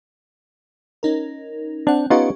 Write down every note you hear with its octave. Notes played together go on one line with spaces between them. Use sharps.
C#4 D#4 A#4
C4 D4 F#5
B3 C#4 D#4 F4 G4 C#6